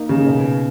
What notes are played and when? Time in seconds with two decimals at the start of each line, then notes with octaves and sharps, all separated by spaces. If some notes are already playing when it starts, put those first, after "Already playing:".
Already playing: A#3 D#4
0.09 C#3
0.27 B2